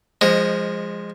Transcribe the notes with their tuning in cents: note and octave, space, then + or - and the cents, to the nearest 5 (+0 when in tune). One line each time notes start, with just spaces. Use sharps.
F3 +0 G#3 -20 D#5 +0